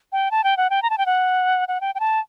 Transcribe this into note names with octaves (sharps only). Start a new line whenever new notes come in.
G5
A5
G5
F#5
G5
A#5
A5
G5
F#5
F#5
G5
G5
A5